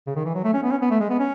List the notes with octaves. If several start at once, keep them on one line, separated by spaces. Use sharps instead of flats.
C#3
D#3
E3
F#3
A3
C#4
B3
C#4
B3
A3
G#3
B3
C#4